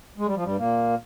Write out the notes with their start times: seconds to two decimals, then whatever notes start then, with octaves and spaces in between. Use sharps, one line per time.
0.18 G#3
0.26 G3
0.35 F3
0.44 G2 G3
0.58 A#2 A#3